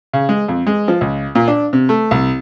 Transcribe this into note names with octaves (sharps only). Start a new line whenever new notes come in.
C#3
G#3
F2
G#3
F3
C#2
A#2
D4
C3
A3
C2